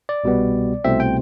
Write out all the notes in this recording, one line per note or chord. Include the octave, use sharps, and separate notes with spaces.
D5
C2 B2 G3 B3
C2 B2 A3 C4 E5
G5